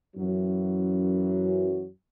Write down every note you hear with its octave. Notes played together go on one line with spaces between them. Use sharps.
F#2 E3 F#3